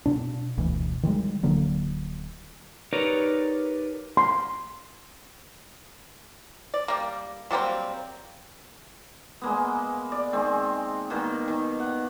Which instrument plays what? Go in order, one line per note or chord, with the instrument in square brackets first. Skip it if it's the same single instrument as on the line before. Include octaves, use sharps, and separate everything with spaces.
[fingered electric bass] B2 D4
F#1 D2 B2 E3
D#3 E3 G3 G#3
D1 D3 F#3 A#3
[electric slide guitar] D#4 G4 A#4 B4 C#5 D5
[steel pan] C6
[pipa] D5
G3 A#3
F#3 G3 A#3 C4
[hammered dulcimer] G#3 A#3 B3
D5
D#3 G#3 C4
B2 D#3 A#3
D#3
F#5